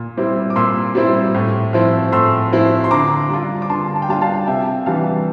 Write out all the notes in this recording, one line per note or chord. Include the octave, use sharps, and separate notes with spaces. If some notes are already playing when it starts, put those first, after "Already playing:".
Already playing: A#2
G3 C4 E4
D6
A#2 C6 E6
G3 C4 E4
A2
F3 C4 E4
A2 C6 E6
F3 C4 E4
C6
D3 A#5 D6
G3 D4 F4
D6
D3 A5 C6
A5
G5
G3 D4 F4 F5 A5
F5 A5
C3 E5 G5
E3 G3 D4 F4 F5 A5